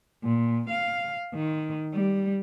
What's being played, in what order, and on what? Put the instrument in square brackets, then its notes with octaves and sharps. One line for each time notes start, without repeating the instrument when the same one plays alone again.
[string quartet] A#2
F5
D#3
G3